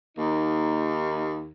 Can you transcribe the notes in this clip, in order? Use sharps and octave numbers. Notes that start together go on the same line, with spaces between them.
D#2 A#3 D#4